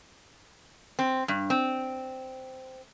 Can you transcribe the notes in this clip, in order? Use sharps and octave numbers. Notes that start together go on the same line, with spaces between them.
C4
G2
C4